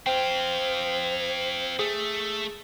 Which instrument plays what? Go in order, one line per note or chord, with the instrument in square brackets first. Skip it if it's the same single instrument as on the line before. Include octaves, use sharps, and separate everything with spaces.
[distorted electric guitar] C4 F4 [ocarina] C5 [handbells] G5
[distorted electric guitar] A3 [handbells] G#4